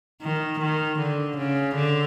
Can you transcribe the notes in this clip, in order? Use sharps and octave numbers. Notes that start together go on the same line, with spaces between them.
D#3
D#3
D3
C#3
D3